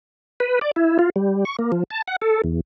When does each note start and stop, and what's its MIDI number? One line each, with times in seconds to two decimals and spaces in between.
0.40 0.59 71
0.61 0.71 74
0.76 0.97 64
0.99 1.10 65
1.16 1.44 55
1.45 1.56 85
1.59 1.71 58
1.72 1.83 53
1.91 2.02 81
2.08 2.16 78
2.22 2.42 69
2.44 2.60 40